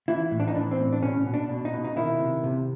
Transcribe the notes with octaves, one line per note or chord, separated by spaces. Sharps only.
E3 E4
A2
D4
D#4
E3 D4
C4
A2
D4
B2 C#4
B2
D4
B2
D#4
B2
D#4
D#3 E4
C3
C3